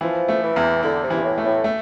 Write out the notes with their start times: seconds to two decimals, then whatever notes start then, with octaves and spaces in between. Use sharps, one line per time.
0.01 E3 F3
0.28 A3
0.43 E3
0.56 E2
0.82 D3 E4
1.03 C3
1.10 E3
1.16 G2
1.24 A2
1.38 A3
1.44 A2
1.64 A3